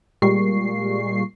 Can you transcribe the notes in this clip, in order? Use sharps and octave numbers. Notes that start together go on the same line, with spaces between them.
A#2 G3 G#3 C#6 C7